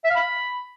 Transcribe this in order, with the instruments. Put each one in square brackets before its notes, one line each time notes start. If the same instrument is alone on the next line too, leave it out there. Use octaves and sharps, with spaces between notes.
[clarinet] E5
F5
B5